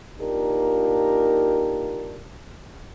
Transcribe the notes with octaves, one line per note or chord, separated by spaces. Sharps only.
A#3 D4 D#4 F4 G4 A#4